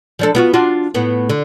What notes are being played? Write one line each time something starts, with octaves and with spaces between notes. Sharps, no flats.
F3 D4 A4
B3 F4 F#4
D4 F4 F#4
A2 B3
D3